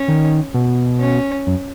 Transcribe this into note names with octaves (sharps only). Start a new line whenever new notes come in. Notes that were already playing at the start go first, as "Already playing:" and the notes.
Already playing: C#4
D#3
B2
C#4
F#2